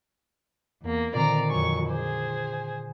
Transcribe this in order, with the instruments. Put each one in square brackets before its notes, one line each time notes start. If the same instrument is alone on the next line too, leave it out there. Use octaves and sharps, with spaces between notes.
[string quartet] E2 A#3
[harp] A#2 D3 D#3 [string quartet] C4 D5 A#5
[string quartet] F2 F#3 C#6 [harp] G#5 A#5
[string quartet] G#4 C5 [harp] D6
[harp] G#5